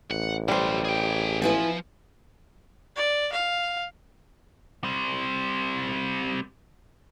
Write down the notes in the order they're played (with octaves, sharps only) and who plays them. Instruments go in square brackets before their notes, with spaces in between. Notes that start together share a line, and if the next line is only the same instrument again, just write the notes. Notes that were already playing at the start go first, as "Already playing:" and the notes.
[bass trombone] A1 [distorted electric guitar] F#5
[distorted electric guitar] B2 F#3 [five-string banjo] G3 C5
[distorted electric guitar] G#4 G5
[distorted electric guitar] F3 [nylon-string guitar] E4 B4 G#5
[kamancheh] D5
F5
[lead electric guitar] G3 C4